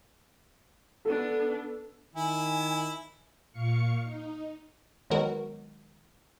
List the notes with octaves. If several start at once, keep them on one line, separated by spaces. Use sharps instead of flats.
B3 D4 A4
D#3 E4 G#5
A#2 F5 C#6 C#7
D#4
D#3 F#3 G#3 B3 F#4 A#4